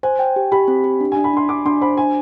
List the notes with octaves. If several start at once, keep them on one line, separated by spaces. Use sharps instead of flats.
C5 G#5
G5
G4
G4 B5
C4
G4
D4
D4 G#5
B5
D4 C6
D4 D6
D4 C6
C5 B5
D4 G#5